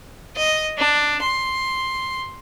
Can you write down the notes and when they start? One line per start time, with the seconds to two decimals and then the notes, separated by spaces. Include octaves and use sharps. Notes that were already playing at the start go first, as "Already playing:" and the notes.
0.36 D#5
0.78 D4
1.22 C6